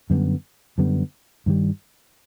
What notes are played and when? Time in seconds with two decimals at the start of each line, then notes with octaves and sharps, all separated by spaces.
0.10 F#2 D3 G3 B3
0.78 F#2 D3 G3 B3
1.46 G2 D#3 G3